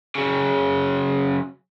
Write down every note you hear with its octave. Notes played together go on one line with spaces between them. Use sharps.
C#3 F#3